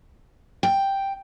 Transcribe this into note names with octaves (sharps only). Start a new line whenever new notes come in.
G5